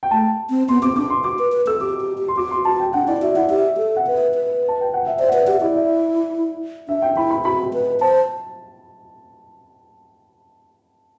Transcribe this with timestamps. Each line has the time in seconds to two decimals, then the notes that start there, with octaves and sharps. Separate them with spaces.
0.03 G5
0.11 A3 A5
0.50 C4
0.68 B3 C6
0.82 C4 D6
0.96 D4 D6
1.10 C6
1.24 F#4 D6
1.39 B4
1.52 B4
1.67 A4 E6
1.81 G4 D6
2.00 G4
2.18 G4
2.28 C6
2.37 F#4 D6
2.51 C6
2.65 F#4 A5
2.80 G5
2.93 D4 F#5
3.08 E4 D5
3.22 F#4 E5
3.36 E4 F#5
3.50 G4 E5
3.78 A4
3.96 F#5
4.06 B4 E5
4.35 B4
4.68 A5
4.81 G5
4.94 F#5
5.07 E5
5.19 C5 D5
5.29 F#5
5.33 B4 E5
5.43 E5
5.47 G4 F#5
5.61 E4 D5
5.75 E5
6.88 D4 E5
7.02 G5
7.17 E4 B5
7.30 B5
7.45 F#4 B5
7.73 B4
8.01 C5 A5